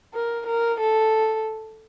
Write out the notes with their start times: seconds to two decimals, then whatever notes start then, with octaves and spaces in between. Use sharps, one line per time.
0.14 A#4
0.46 A#4
0.80 A4